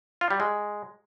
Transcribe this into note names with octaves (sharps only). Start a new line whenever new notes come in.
F4
G3
G#3